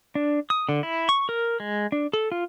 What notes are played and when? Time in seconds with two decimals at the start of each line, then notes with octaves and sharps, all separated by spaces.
0.15 D4
0.50 D#6
0.69 D3
0.83 E4
1.09 C#6
1.29 A#4
1.60 G#3
1.92 D4
2.13 A4
2.32 F4